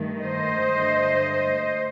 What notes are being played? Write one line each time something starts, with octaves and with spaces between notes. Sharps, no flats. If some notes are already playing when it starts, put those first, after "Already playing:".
Already playing: G2 D#3 A3
C5 D#5
G2 D3 A3